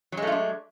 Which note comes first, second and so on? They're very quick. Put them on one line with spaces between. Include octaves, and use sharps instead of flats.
F#3 G#3 A3 F4 D4